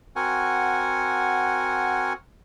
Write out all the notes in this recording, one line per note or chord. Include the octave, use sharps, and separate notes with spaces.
C4 F#4 A#4 F#5 G#5